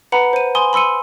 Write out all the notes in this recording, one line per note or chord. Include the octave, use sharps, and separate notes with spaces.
B4 F#5 A#5 B5
C5 D#7
G#5 B5 C6 D#6 G7
B5 C6 E6 C#7 D#7